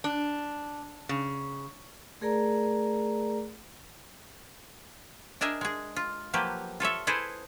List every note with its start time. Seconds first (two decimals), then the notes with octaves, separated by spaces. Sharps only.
0.04 D4
1.09 C#3
2.21 A3 G#4 A#4 D5 A#5
5.41 D4 G#4 A#4 D#5 E5 G#5
5.61 G#3 G#4
5.96 F4
6.33 F3 F#3 A#3 G4 B4
6.80 F4 A4 C#5 E5
7.07 E4 G#4 A4 B4 C5